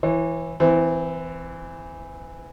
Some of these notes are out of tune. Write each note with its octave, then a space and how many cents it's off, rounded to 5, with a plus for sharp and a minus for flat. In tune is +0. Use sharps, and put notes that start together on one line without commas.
E3 +0 C#5 -40
E3 +0 C4 -30